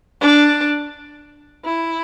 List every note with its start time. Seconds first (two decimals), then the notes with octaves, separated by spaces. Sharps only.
0.21 D4
1.65 E4